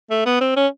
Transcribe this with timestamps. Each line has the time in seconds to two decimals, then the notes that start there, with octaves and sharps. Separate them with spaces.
0.11 A3
0.26 B3
0.41 C4
0.56 C#4